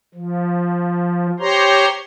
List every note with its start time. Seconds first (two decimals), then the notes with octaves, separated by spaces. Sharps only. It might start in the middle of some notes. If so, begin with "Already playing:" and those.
0.14 F3
1.40 G4 C5 C#5 A#5 C6